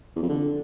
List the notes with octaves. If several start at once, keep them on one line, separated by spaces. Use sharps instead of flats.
E2
F2
D3